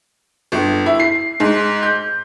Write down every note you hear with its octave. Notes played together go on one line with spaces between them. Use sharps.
G1
E4
C7
G#2
G6